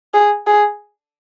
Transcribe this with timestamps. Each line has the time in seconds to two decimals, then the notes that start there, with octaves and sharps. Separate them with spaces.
0.14 G#4
0.47 G#4